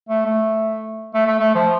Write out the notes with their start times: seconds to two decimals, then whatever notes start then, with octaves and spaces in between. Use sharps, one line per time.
0.09 A3
0.25 A3
1.14 A3
1.26 A3
1.39 A3
1.55 F3